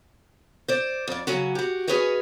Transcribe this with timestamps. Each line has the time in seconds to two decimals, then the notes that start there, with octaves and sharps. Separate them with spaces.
0.68 C5 D5
1.08 F2 D5
1.27 C#3 F#3 C#4 F#4
1.55 F#4 G4
1.88 C#4 F#4 G#4 B4 C#5 D#5